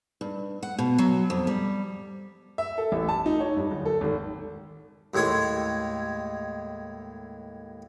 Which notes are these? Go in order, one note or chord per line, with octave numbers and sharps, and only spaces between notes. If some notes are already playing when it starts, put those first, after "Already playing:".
G2
F#5
B2
F#3
F2
G3
E5
A4
A1
A5
D#4
C#5
G2
D1
A4
G#1
D#2 A2 G#3 C#5